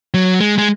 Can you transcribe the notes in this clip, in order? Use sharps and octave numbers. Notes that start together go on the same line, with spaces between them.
F#3
G#3
G#3